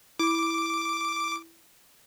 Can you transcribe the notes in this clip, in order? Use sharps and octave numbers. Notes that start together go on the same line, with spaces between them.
E4 D6